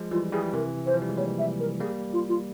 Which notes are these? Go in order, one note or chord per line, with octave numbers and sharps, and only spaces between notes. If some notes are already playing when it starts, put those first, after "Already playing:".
Already playing: F3 G#3
E3 G3 F4
E3 G3 G#4
C3 E3 A#4
E3 C5
F3
G3
G#3
G3 A#3 C#5
E5
A#4
G3 A#3 G#4
F4
F4